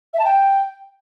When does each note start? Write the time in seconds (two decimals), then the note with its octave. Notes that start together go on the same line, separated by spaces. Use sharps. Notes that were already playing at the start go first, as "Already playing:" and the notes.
0.14 E5
0.19 A5
0.25 G5